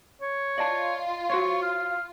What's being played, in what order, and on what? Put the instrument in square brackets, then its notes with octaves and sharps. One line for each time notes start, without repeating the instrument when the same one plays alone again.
[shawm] C#5
[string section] F4 [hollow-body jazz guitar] D5 D#5 A5
[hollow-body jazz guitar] F#4 C5 C#5 [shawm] C#6
[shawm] F5